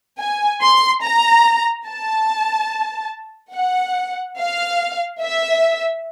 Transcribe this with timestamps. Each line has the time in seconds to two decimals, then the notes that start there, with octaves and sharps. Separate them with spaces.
0.19 G#5
0.62 C6
1.03 A#5
1.87 A5
3.54 F#5
4.38 F5
5.21 E5